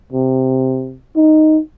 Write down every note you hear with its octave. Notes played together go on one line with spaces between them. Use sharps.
C3
D#4